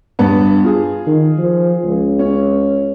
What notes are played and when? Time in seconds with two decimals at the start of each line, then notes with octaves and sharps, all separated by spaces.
0.19 G2 B3
0.64 F4 G#4
1.07 D#3
1.38 F3
1.84 C#2
2.19 C#4